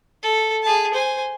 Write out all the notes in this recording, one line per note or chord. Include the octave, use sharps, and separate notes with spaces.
A4
G#4 A5
C5 G#5